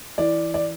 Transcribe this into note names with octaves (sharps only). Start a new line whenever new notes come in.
E3 D5
D5